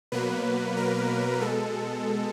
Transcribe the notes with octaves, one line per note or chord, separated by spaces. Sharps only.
B2 F#3 A#3 B4
A#4
B2 G#3 A4